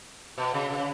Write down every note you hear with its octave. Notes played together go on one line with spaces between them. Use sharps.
B2
C#3
C#3